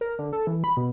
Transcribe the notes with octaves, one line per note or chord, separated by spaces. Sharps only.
A#4
D3
A4
E3
B5
B2